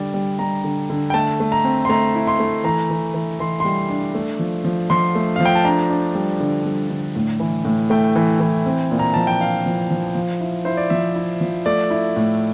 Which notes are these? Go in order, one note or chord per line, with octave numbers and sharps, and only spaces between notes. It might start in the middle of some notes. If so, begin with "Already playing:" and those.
Already playing: D3 G3 D5
G3
G3 A#5
D3
D3
G5
A3 A5
A3
A#5
C4
C6
A3 A#5
E4
C6
A3
E3 A#5
E3
E3
E3 C6
G3 C6
D4
A3
F3
F3
F3 C6
A3
F3 F5
G5
A5
D4 A#5
D4
G3
D3
G3
D3
A2
E3
A2
A3 G5
E3
E3
C4
A#2
A#5
F3 A5
G5
E4 F5
F3
F3
F3
E4
E4 C5
D5
F3 E5
E4
F3
A3 D5
E4
A2